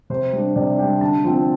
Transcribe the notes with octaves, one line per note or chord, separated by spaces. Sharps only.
C3 C5
G3 D4
C3 D5
G3 D4 G5
D3 A5
F3 C4